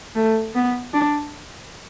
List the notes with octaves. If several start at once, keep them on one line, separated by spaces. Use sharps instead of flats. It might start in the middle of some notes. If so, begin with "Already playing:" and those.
A3
B3
D4